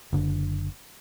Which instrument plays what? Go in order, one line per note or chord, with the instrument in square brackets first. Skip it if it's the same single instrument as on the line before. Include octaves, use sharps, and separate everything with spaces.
[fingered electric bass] F#1 D3